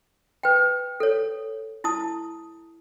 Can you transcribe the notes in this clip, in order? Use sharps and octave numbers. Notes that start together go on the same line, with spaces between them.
B4 G5
A4 C#5
E4 A5 D#6